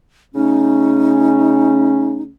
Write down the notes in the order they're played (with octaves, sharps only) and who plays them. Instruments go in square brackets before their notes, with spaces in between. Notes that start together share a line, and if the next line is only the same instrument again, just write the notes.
[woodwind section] C#3 A3 C#4 [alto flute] D#4